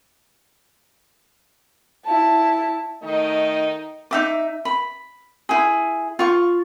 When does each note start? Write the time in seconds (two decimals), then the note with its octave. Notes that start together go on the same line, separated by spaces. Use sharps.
2.06 E4 A5
3.03 D#3 A3 D#4 D#5
4.11 D#4 E5 D6
4.65 B5
5.49 E4 G#4
6.19 F4 C#6